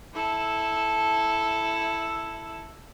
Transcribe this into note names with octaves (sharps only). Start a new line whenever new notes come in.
E4 A4